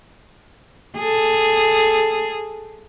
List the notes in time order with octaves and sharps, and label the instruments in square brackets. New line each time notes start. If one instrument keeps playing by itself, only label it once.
[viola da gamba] G#4 A4